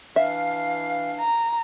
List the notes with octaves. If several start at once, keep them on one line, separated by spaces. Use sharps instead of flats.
E3 D4 E5 F5
A#5